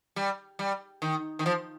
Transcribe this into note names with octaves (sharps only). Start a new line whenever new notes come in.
G3
G3
D#3
D#3
F3